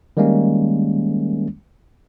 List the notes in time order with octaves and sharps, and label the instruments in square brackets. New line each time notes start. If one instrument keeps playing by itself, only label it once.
[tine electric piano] D#3 G3 G#3 A#3 C#4